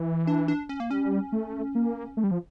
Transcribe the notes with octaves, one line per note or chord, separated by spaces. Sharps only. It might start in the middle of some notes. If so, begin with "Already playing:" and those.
Already playing: E3
D4
D4
C#4
A#3
G3 C#4
A3
A#3
A3
G3
F3